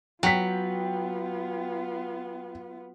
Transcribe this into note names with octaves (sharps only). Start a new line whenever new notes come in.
F#3 B3 F4 G5 B6